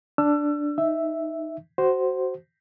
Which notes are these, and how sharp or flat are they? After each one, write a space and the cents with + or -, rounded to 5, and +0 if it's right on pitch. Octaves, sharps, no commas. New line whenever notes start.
D4 +0 E6 +30
D#4 +0 E5 +0
F#4 +20 C5 +0